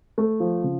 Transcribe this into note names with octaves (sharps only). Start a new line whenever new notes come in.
A3
F3
C#3